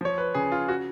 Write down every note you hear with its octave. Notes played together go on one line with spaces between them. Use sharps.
F3 C#5
B4
C#3 G#4
F4
F#4